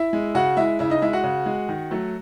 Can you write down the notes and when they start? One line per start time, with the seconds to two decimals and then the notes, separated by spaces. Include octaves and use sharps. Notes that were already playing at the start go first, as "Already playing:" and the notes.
Already playing: E4 E5
0.13 G#3
0.35 C#3 F#4 F#5
0.57 G#3 E4 E5
0.79 C#3 E4 E5
0.90 D#4 D#5
1.02 G#3 E4 E5
1.13 F#4 F#5
1.24 C#3
1.46 G#3
1.69 D#3
1.91 F#3 A3